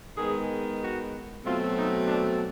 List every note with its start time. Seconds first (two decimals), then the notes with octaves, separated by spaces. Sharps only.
0.17 D#3 G#3 B3 G#4
0.81 F#4
1.44 B2 F#3 A3 C4 F4
1.76 D#4
2.07 D4